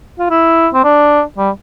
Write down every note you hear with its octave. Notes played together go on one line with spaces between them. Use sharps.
F4
E4
C4
D4
G3